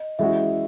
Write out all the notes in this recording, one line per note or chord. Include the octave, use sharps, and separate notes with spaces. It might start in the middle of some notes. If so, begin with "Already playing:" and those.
Already playing: D#5
E3 G#3 C#4 F#4 E5